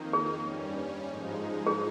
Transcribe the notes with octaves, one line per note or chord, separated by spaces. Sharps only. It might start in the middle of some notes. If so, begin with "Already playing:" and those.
Already playing: F2 D#3 A#3 D#4
G#4
G2 G3 C#4
G#2 F3 G#3 D#4
G#4